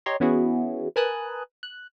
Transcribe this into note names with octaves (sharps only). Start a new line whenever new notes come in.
G4 C#5 D#5 A#5 C6
E3 B3 C#4 E4 F#4 G#4
A#4 B4 G#5 A5 D#6 F#6
F#6